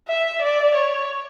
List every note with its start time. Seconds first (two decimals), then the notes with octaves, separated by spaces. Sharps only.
0.08 E5
0.42 D5
0.75 C#5